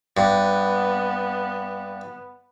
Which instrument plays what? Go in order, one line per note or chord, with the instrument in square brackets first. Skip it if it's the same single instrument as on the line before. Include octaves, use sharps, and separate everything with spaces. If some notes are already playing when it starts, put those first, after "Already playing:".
[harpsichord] G2 [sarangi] B3